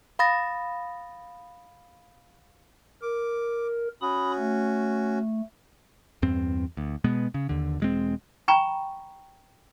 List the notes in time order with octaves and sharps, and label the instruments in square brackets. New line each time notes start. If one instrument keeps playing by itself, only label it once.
[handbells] F5 B5 D#6 A6 A#6
[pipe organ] A#4 [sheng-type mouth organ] D6
[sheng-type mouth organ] C#4 F#4 [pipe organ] B5 D#6
[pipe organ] A3
[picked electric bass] E2 G2 C4
D2
B2 G#3 B3
C#3
D#2 D3
E1 G#3 C4
[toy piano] G5 G#5 A#5 B5 C#6